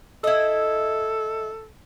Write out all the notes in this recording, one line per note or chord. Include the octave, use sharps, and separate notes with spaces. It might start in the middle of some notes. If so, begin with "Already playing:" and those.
E4 A4 D#5